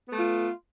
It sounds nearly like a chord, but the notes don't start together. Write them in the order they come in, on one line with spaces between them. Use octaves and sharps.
B3 A3 F4